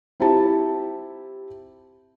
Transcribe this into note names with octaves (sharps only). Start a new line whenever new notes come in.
C4 E4 F4 G4 A5